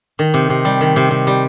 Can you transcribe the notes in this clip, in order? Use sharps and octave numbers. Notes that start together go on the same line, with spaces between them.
D#3
C3
C3
G3
D#3
C3
C3
G3